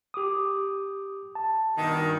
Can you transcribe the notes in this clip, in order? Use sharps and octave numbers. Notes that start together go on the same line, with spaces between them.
G4 D6 D#6
A5
G2 B2 D#3